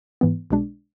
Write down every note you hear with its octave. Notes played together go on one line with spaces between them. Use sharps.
G#2 E3 B3
B1 B2 G#3 D4